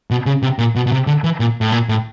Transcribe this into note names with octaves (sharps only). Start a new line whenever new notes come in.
B2
C#3
C3
A#2
B2
B2
C3
D3
E3
A#2
A2
A#2
A2